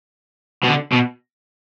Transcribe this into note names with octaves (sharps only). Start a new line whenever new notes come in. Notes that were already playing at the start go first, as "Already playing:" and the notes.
B2
D3
B2